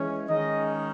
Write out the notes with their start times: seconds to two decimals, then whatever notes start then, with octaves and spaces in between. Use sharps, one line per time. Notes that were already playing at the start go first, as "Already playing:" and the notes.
Already playing: E3 G#3 C#4
0.28 D#3 G#3 C#4 D#5